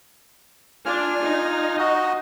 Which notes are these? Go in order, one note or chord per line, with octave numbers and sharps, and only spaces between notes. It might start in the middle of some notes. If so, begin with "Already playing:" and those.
D4 F4 G#5 F6
D#4
F#4 D#5